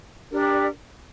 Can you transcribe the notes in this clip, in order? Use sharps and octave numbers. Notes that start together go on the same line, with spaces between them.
D4 G4 A#4 D5